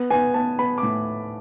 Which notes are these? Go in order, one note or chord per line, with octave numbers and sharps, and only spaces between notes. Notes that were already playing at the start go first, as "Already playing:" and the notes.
Already playing: B3
B3 G#5
B3 A5
B3 B5
D6
A2